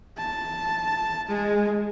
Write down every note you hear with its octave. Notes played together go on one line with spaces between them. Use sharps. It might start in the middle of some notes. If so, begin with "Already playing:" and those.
A5
G#3